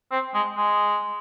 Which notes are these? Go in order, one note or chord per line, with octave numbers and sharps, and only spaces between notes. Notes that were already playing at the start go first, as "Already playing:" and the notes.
C4
G#3
G#3